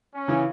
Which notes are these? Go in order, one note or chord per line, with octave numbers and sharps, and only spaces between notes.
C#4
C#3 E3